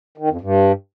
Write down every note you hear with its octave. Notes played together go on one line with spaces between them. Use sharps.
D#3
F2
G2